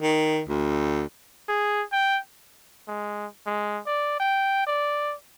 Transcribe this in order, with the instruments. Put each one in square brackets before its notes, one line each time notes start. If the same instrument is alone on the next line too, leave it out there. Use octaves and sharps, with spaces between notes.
[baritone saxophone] D#3
D2
[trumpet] G#4
G5
[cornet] G#3
G#3
D5
G5
D5